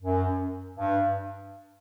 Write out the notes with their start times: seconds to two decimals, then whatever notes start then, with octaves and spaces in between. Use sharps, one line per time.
0.02 F#2
0.77 G2